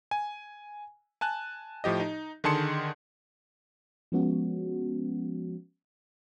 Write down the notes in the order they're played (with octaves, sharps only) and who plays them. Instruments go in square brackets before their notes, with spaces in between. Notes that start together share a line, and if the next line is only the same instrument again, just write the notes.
[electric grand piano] G#5
G#5 A5 F#6
A2 F3 G4 D#5
D#4
D3 D#3 G#4 A5 C6 C#7
[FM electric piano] F3 G#3 B3 C#4 F#4